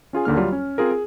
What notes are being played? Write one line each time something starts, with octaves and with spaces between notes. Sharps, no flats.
C#4 F4 G#4 G#5
D#2 D3 A#3 F6
F#3 G3 F4
C#4
C4 F4 G#4 A#4
G#4